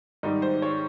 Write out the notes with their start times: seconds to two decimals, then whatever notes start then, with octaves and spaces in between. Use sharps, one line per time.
0.23 G#2 D#3 G3 D#4
0.42 C5
0.62 C#5